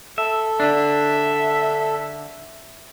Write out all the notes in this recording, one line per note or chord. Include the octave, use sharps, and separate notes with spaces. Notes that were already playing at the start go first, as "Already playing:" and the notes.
A4 E5
D3 D4 E5